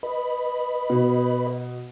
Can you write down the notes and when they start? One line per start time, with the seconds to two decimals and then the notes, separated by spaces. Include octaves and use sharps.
0.03 B4 D#5 B5
0.90 B2